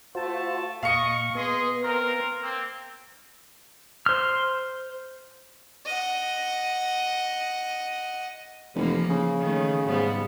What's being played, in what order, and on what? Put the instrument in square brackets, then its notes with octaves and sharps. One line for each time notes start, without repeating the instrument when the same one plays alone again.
[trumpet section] A3 A5 [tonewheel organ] F4 F#4 C5
[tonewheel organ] A#2 [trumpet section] D#5 C#6 [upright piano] F5 C#7
[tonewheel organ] B3 [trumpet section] G#4 D#5 C6
[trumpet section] C4 F4 A#4
A#3 C4
[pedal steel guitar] C5 F6
[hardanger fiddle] D#5 F#5
[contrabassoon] F1 [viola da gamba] E3 F3 A#3
[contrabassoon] C#3
[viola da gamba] D#3 A3 C#4
G#2 G3 B3